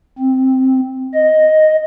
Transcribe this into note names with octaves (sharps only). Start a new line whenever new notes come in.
C4
D#5